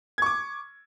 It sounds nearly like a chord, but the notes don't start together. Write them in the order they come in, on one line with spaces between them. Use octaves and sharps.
G#6 C#6 D6